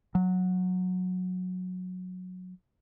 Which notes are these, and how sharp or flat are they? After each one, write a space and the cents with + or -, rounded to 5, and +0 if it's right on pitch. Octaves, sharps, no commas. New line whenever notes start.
F#3 -15